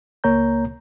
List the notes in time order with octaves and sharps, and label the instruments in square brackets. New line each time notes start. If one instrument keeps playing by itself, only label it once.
[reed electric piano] C#2 A#3 C#5 A#5 G6